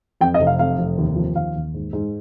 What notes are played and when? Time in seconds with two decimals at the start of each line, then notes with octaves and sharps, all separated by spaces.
0.21 F2 G5
0.34 D#5
0.40 F1
0.47 F5
0.59 F2 F5
0.78 F1
0.98 D#2
1.16 F3
1.36 D#2 F5
1.55 D#2
1.74 G#2
1.93 G#2